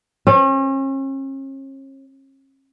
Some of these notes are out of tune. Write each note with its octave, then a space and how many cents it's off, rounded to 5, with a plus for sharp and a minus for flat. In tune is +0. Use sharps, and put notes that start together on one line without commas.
C#4 -40